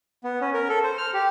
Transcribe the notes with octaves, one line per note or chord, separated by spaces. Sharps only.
B3
C#4
A#4
A4
C5
F6
G4